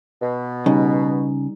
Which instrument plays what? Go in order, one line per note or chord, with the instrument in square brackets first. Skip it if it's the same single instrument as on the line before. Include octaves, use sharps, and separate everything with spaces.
[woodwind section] B2
[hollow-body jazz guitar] C#3 [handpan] G3 D#4